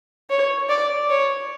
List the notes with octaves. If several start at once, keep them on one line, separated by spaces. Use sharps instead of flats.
C#5
D5
C#5